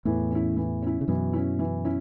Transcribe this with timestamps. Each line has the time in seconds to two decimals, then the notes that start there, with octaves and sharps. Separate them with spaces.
0.05 E2 A2 E3
0.31 C#4 E4
0.56 E3
0.82 C#4 E4
1.01 C#3
1.08 F#2 B2 E3
1.33 C#4 E4
1.59 E3
1.85 C#4 E4